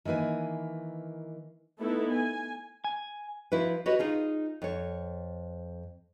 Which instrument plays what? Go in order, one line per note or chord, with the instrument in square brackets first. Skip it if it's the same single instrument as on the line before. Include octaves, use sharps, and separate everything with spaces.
[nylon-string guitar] D#3 E3 A#3 B4 G#5
[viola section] A3 B3 D#4 E4 A4
G#5
[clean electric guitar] G#5
[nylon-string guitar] F3 E4 F#4 B4
F#4 G4 B4 C#5 D#5
D#4 F4 G#4
F2 C#5